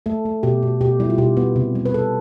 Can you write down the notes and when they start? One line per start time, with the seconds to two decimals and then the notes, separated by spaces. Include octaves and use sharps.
0.06 A3 A4
0.25 A3
0.43 B2 G4
0.63 B2
0.81 B2 G4
1.00 G3 E4
1.10 F4
1.18 B2 G4
1.37 B3
1.56 C3
1.75 G3
1.86 B4
1.94 C3 A4